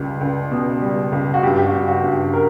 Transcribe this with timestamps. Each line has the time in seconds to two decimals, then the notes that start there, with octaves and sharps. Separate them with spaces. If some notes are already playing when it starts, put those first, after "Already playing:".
Already playing: C#2 G3
0.21 C#2
0.51 B2
0.82 G3
1.12 C#2
1.34 F#4
1.43 G2 G4
1.57 G4
1.66 F#4
1.73 G2
1.88 F#4
2.03 G2
2.11 G4
2.33 A#4